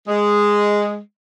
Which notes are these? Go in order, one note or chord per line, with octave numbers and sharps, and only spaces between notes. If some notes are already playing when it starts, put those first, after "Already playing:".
G#3